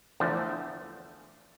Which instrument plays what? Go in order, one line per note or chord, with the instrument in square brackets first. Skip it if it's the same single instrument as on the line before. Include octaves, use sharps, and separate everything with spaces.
[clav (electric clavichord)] E2 D3 F3 A3